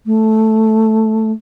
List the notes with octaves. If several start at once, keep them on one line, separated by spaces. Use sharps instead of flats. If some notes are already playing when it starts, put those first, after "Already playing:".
A3